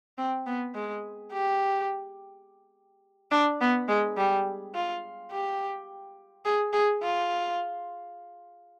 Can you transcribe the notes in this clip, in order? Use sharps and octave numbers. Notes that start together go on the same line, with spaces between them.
C4
B3
G#3
G4
D4
B3
G#3
G3
F4
G4
G#4
G#4
F4